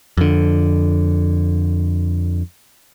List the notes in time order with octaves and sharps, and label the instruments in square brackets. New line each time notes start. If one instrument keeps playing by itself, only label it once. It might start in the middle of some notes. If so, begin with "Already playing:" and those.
[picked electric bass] F2 D3